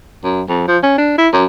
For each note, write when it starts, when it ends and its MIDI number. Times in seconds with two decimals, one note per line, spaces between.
0.24 0.42 42
0.49 0.64 41
0.68 0.78 53
0.83 0.95 61
0.98 1.18 62
1.18 1.28 64
1.33 1.45 42